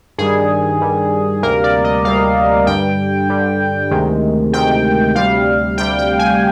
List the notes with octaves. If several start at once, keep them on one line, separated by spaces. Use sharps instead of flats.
G2 D#3 G3 G#4
G2 D#3 G3
D2 C3 G3 A#3 A#4
D5
D#5
D2 C3 G3 A#3 F5
G2 D3 G3 G5
G2 D3 G3
D2 C3 D#3 G#3
D2 C3 D#3 G#3 G5
D2 C3 G3 F5
D2 C3 G3 G5
G5
G#5